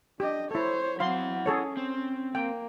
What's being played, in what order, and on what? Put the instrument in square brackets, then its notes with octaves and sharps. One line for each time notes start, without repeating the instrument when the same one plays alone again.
[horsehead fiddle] D4 D#5 [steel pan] G4
[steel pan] E4 A4 [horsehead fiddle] C5 C#5
[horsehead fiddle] F#3 C4 [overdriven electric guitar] E4 F#5 [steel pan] F5 C6
[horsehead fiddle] C#4 [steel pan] G#4 A4 C#5
[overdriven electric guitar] C4
[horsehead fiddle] A#3 [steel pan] G5